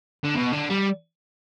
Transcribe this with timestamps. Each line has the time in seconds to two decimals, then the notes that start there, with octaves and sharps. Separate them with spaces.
0.24 D3
0.35 B2
0.53 D3
0.70 G3